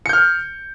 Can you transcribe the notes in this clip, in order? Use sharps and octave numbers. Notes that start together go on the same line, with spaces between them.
F6 G6 C#7